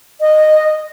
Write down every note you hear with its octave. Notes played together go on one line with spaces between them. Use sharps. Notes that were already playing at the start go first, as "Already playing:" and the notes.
D#5